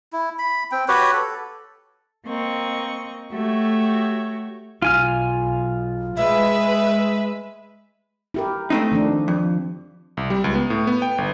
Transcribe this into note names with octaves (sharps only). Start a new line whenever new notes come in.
E4
B5
C4 G5
F#4 G4 B4 C#5
A4
A#3 C4 D#5 C#6
A3 F#4 G4 C#5 E5
B1 F4 G#5 F6
G#3 B4 E5
E4 G4 A#4
A3 C4 D#4
D#3 F3 D4
F2
C2
G3
C#2
B3
A2
B3
G5
G1